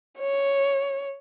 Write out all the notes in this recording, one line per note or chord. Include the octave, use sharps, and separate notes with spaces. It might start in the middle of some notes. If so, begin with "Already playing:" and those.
C#5